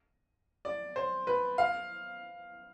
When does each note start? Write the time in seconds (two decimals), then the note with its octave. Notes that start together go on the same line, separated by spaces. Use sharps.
0.65 D5
0.96 C5
1.27 B4
1.58 F5